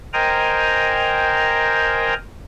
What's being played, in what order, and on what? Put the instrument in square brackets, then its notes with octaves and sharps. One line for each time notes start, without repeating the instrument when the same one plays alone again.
[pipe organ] A#4 C5 D#5 G5 G#5 A#5